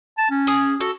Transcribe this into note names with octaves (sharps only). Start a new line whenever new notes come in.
A5
C#4
G#4 D#6
F#4 A4